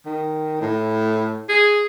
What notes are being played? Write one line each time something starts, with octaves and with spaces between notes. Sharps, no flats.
D#3
A2
G#4